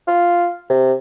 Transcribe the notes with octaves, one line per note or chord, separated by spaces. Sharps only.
F4
C3